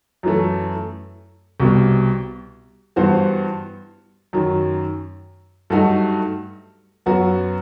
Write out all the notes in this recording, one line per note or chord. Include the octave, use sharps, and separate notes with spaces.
F#2 E3 A3
C2 B2 G3
G2 E3 B3 F#4 C5
F#2 D#3 F#3
G2 F#3 A3 D#4 F#4
F#2 F#3 B3 F#4